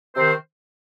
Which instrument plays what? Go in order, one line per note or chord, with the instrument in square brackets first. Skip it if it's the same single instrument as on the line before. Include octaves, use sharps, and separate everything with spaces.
[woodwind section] C3 D#3 C4 C5